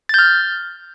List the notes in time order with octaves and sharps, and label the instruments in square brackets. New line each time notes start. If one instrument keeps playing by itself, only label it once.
[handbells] A6
G6
F6